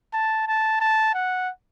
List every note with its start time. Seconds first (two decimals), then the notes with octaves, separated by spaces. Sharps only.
0.13 A5
0.47 A5
0.81 A5
1.14 F#5